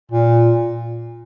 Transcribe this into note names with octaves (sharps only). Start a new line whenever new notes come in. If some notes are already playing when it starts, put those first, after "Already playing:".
A#2